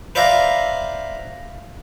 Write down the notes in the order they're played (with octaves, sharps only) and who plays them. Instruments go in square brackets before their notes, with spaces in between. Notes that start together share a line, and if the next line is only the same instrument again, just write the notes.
[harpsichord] B4 C5 D5 E5 F5 A#5